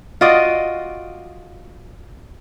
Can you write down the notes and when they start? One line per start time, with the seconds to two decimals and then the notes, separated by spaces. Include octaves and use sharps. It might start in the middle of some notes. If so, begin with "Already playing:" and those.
0.21 F4 F#4 D5 D#5